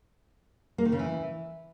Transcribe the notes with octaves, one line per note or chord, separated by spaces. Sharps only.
A#3
D#3
C#3
E3